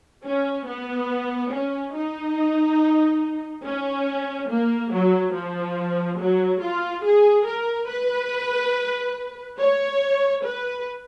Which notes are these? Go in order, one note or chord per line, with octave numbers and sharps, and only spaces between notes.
C#4
B3
C#4
D#4
C#4
A#3
F#3
F3
F#3
F4
G#4
A#4
B4
C#5
B4